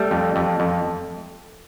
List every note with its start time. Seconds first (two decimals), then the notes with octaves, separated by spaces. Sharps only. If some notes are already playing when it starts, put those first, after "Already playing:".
Already playing: G3 A3 A4
0.11 F2
0.36 F2
0.60 F2